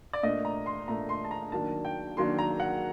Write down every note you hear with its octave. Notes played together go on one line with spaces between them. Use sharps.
D5
A#2 A3 D4 D#5
A#5
C6
A#2 A3 D4 A#5
C6
A5
A#5
D#3 F#3 A#3 D4 A5
G5
D#3 F#3 A#3 D4 C6
A#5
F#5